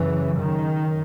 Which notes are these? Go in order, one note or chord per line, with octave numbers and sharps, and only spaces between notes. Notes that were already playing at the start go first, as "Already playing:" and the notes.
Already playing: F#2 C#3 E3
D#3